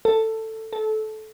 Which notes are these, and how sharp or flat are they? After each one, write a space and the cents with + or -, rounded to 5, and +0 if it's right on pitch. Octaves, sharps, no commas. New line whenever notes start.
A4 +10
A4 -20